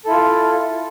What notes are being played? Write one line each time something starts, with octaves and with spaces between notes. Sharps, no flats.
E4 F4 A4